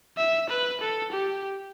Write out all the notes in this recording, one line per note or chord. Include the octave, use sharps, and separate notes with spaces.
E5
B4
A4
G4